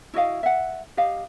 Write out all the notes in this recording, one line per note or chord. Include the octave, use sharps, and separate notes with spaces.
E4 F#4 D#5 F5
E5 F#5
G4 D#5 F5